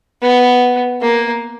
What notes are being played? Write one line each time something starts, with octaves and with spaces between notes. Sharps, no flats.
B3
A#3